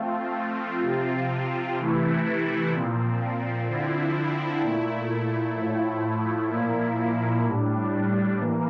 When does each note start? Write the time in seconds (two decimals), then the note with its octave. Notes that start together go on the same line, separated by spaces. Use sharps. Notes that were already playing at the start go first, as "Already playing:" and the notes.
Already playing: F3 A3 C4 F4
0.83 C3 F3 C4 F4
1.78 C3 E3 A3 E4
2.72 A#2 F3 C4
3.67 D3 F3 C4 E4
4.61 A#2 A3 E4
5.55 A2 F3 A3 E4
6.50 A#2 F3 A#3 E4
7.45 A2 G3 D4
8.39 E3 A#3